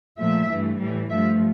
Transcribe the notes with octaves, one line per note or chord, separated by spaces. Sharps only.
A#2 F3 A3 E5
G2 E3 A3
A2 E3 G3
G2 F3 A3 E5